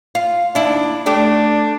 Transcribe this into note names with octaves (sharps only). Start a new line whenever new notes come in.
F4
D#2 D4 E4
A3 D4 G4